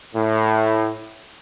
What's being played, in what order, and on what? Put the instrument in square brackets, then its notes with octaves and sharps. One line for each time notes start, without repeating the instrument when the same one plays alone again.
[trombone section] A2